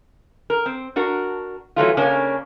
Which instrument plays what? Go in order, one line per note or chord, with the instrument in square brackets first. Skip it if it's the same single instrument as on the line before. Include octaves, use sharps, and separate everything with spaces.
[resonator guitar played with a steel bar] A#4
C4
D4 F#4 A#4
E3 F#3 A3 F4
C#3 A#3 C#4 D4